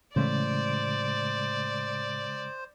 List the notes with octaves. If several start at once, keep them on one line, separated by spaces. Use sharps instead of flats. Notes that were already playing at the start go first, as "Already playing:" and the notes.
A2 C#3 E3 G#3 A3 C5 D5